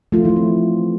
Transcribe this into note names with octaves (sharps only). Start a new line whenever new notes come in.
F3 A3 F4
E3 A3 E4
C4